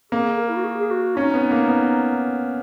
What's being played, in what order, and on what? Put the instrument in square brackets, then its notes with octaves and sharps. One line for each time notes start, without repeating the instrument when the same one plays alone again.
[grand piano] A#3 [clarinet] G#4
[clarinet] A#4
E4
F#4
G#4
G#4
F#4
[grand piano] C#4 [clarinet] D#4
[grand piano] B3
A#3
B3